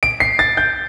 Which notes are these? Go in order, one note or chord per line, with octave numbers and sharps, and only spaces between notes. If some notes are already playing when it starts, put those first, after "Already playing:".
D7
C7
A6
G6